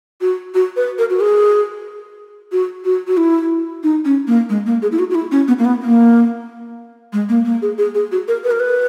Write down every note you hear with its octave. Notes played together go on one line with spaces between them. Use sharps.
F#4
F#4
B4
A#4
F#4
G#4
F#4
F#4
F#4
E4
D#4
C#4
A#3
G#3
A#3
G#4
E4
F#4
F#4
E4
C#4
B3
A#3
B3
A#3
G#3
A#3
A#3
G#4
G#4
G#4
F#4
A#4
B4
A#4
B4